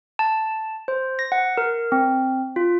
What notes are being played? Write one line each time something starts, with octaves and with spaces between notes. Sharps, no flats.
A5
C5
A#6
F#5
A#4
C4
F4